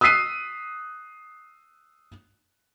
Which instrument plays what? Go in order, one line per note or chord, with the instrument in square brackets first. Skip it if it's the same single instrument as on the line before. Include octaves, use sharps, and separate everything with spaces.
[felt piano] D#6 E6 F#6 B6 C7 D#7